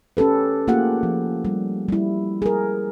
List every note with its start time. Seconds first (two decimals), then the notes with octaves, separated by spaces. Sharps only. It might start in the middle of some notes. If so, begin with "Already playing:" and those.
0.17 C#4 G4 A4 B4
0.67 A3 A#3 F4 G4 G#4 F#5
1.03 F3
1.45 G3
1.89 G3 E4
2.42 G#4 A#4